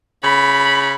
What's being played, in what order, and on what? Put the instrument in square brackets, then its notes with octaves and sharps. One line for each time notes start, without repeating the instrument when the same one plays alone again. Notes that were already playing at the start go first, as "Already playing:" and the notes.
[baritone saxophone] C#3 [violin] B5